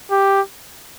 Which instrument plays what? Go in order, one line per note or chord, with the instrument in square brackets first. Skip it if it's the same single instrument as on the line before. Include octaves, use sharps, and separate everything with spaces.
[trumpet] G4